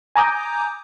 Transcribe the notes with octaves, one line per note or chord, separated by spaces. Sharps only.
G#5 A#5 D6 D#6 G6